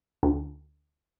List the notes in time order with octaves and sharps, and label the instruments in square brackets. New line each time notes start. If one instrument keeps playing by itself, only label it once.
[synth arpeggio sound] D2